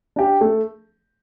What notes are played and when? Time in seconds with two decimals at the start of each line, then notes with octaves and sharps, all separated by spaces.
0.16 D4 G4
0.41 A3